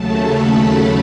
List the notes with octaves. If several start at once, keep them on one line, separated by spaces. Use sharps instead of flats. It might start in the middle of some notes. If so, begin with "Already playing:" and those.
Already playing: D#2 C#3 F#3 A3 A5
B5